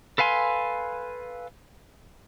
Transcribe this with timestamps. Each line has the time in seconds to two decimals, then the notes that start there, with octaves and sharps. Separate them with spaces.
0.18 A4 B4 F5 G#5 C6